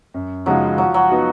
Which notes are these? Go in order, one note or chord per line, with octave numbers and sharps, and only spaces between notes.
F#2
C#3 F3 F#3 G#3 D#4
F3 F#3
F#3
B3 D#4 F#4